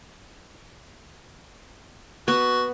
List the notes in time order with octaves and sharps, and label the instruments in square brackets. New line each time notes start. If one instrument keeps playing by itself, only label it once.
[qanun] B3 [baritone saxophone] F#4